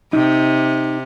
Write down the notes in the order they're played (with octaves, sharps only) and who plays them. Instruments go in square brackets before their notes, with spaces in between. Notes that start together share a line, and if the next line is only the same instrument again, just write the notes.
[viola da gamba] C3 [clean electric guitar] D#4